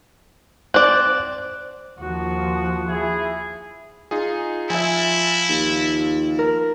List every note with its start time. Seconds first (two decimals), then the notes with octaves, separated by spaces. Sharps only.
0.74 C4 D5 F#6
1.99 D#2 F3 F#4
2.88 E4 G#4
4.11 D#4 F4 G#4
4.70 F3 E4 E5 G#5
5.49 D#2
6.39 A#4